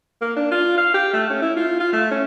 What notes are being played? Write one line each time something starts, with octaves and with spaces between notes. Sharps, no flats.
A#3
D4
F4
F5
G4
A3
C#4
E4
F4
F4
A3
C#4